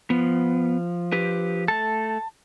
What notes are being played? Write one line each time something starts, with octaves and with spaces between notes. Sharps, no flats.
F3 B3
G4 B4
A3 A4 A5